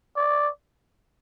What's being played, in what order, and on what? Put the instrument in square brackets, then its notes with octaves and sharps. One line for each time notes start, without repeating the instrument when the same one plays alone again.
[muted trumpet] D5